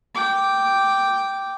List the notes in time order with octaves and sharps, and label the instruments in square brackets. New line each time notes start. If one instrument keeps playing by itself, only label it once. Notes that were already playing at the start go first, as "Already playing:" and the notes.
[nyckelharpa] G5 D6